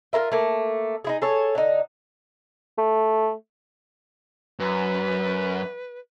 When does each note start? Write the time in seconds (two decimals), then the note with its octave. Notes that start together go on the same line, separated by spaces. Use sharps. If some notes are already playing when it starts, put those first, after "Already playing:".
0.13 F4 A4 A#4 E5
0.32 A3 A#3
1.05 D#4 E4 G#4
1.22 G#4 A4 C#5
1.55 D3 D#4
2.78 A3
4.59 F#2 B4